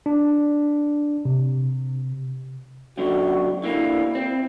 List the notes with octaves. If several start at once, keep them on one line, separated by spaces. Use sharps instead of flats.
D4
C3
C#2 F#2 D3 F#4
D3 A#3 E4
C4